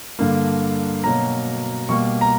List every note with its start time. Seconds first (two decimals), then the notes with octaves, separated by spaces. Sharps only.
0.19 G2 D3 A#3
1.04 B2 F#3 A#3 A#5
1.89 B2 G3 A#3 C#6
2.21 A#5